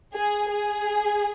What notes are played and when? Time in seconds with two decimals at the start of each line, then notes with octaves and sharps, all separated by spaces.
0.15 G#4
0.51 G#4